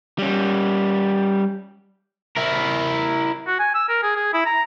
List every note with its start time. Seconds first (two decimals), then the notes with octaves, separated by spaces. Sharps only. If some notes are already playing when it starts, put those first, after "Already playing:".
0.18 G3 C#4
2.36 E4 A#4
3.47 F#4
3.59 G#5
3.75 E6
3.89 A#4
4.03 G#4
4.16 G#4
4.33 E4
4.46 A#5